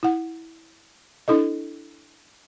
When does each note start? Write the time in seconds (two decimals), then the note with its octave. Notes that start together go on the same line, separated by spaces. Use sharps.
0.03 E4 F#5
1.28 D4 E4 A4 D#5